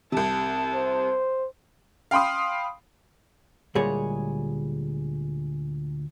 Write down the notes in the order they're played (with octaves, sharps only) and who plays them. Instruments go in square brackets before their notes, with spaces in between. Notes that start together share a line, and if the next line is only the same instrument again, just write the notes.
[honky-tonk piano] C2 C3 [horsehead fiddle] A5
[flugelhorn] C5
[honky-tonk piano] F5 G5 B5 C6 D#6
[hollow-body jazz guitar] D2 A#2 G3 G#3 G#4 C#5